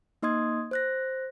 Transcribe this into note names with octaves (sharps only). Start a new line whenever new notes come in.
A#3 D#4 D#5 C6 D#6 G#6
C5 F#6 A#6